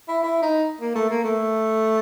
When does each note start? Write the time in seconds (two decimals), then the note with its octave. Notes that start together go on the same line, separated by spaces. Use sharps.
0.08 E4
0.23 E4
0.42 D#4
0.81 A#3
0.95 A3
1.10 A#3
1.24 A3